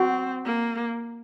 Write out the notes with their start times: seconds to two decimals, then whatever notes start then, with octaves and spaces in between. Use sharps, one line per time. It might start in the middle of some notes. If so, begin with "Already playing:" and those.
Already playing: C4 F#4
0.45 A#3